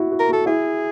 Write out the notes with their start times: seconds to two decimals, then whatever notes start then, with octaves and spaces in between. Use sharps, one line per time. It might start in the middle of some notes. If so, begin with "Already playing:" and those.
Already playing: E4 F#4
0.12 F#4
0.19 A#4
0.29 F#4 A4
0.46 E4 G#4